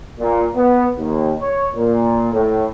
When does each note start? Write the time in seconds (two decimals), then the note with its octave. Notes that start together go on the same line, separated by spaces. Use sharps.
0.19 A#2
0.56 B3
0.99 D#2
1.40 C#5
1.75 A#2
2.33 A2